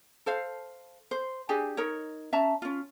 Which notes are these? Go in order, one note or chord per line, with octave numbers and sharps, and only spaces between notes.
A4 C5 F5
C5
D4 G4 G#4 G#5
D#4 A#4 C#5
C#4 E5 A5 A#5
C#4 F4